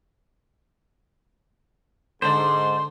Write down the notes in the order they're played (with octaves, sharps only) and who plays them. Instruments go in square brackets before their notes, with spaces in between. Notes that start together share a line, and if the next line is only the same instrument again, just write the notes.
[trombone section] G#2 [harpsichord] D3 [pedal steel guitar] C5 D5 [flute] C6